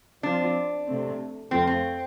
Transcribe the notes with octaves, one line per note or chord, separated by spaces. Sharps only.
F3 C4 D4 F4
C3 A3 C4
F2 F3 A3 C4 F4
C4